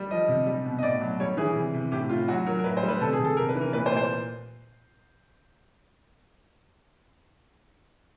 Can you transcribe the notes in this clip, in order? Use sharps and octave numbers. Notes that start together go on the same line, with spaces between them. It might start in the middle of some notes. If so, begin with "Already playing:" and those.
Already playing: G3
F3 D#5
C3
G3
B2
D#5
A2 D5
F#3
G3 C#5
E3 G#4
C3
C3
A2 G4
A2 F4
F#3 F#4
F#3 A#4
A#4
A2 B4
C5
G3
B4
C3 A4
G#4
C3
A4
C3 A#4
B4
E3
A#4
A#2 B4
C5
A#2
C5